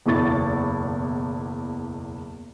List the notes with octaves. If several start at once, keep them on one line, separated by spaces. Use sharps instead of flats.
F#1 B1 E2 E4 C#6 A6